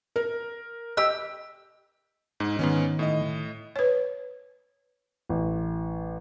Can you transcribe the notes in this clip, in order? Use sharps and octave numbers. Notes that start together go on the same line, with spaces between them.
A#4
G4 D#5 E6
G#2 D#4
G#2 D#3 B3 C#4
A2 D#5
B4 C#5
A1